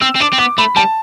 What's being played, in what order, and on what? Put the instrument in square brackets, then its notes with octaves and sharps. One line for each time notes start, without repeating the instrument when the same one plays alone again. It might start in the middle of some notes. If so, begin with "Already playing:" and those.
[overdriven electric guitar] C4 [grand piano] E6
[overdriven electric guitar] C4
[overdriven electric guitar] D4 [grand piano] D6
[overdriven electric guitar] C4
[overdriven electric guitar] B3 [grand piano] D6
[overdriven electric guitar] A3 [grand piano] B5
[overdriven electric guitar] G3 [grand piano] A5